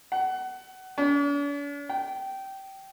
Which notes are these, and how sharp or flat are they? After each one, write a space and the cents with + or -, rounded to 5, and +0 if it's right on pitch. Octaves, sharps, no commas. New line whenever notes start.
F#5 +25
D4 -45
G5 -20